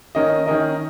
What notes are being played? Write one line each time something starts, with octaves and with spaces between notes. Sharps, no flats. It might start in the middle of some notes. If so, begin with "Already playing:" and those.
D#3 C#4 A#4 D#5
D#3 C#4 A#4 D#5